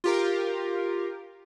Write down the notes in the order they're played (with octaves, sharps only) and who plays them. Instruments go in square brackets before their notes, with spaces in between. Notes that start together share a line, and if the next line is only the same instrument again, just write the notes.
[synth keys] F4 G4 A#4